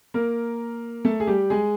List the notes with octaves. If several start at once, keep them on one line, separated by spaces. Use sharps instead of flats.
A#3 A#4
A3 A4
G#4
G3 G4
G#3 G#4